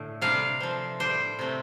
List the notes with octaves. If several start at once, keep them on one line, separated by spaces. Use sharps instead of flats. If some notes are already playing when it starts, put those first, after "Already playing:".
Already playing: A2 D3 A3
C3 G3 D4 F5
F3 C4
A2 G3 D4 C5
C3 A3 C4